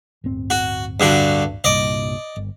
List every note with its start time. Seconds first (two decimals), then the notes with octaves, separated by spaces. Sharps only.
0.24 D1 G1 C4
0.50 F#4
1.00 G2 D3 F#4
1.64 C2 G2 A#2 D5 D#5
2.37 G1